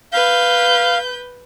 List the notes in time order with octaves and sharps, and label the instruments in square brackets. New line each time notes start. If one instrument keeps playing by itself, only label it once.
[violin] B4 G6 [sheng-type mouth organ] F5